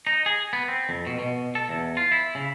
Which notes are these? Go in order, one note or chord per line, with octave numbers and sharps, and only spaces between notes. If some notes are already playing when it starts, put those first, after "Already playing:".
D#4
G#4
B3
C4
F2
B2
B2
A4
E2
F4
E4
C#3